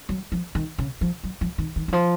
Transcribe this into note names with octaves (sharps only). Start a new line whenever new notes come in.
F#3
F3
D#3
C#3
F3
F#3
F3
D#3
D#3
D#3
F3